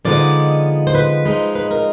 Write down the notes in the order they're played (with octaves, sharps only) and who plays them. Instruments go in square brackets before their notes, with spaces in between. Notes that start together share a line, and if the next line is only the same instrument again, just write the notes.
[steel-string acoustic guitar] D3 F3 G#3 B3 D#4 D5
C5
B4
F3 G#3 C4 D#4
B4
A#4